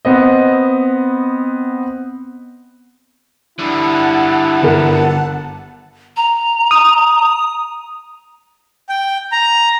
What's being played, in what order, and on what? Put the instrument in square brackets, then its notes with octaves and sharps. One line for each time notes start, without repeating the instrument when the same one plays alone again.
[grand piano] B3 C4 D#5
[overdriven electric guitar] D3 G3 [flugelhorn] E4 [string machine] F#5 A5
[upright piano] G1 A#4
[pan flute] A#5
[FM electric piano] D#6
[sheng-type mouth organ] G5
A#5